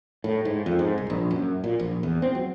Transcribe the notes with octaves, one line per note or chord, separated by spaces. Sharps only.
A2
G#2
F2
G#2
C2
A#1
F#2
A#2
A#1
E2
C4
F#3